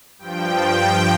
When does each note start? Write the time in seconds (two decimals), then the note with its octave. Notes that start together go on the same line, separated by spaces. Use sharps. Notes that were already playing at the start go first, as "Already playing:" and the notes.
0.18 G2 F3 G5
0.74 G5